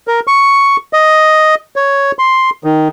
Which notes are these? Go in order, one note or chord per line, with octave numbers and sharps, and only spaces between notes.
A#4
C#6
D#5
C#5
C6
D#3